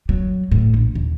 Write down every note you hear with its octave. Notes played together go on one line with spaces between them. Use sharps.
F#3
A2
A#1
D#2